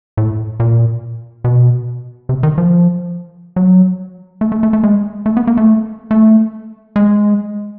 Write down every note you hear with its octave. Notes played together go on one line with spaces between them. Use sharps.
A2
A#2
B2
C3
D#3
F3
F#3
A3
A3
A3
A3
G#3
A3
B3
A#3
A3
A3
G#3